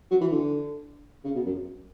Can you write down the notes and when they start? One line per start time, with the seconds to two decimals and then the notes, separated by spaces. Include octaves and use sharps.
0.10 F#3
0.21 E3
0.31 D3
1.24 C#3
1.35 B2
1.45 F#2